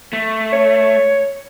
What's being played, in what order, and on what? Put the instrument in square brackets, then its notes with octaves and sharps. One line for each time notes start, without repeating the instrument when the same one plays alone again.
[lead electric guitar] A3
[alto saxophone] C#5